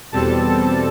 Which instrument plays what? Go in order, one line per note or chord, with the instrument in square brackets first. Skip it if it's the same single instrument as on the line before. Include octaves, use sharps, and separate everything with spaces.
[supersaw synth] E2 B2 G3 C4 A4 A5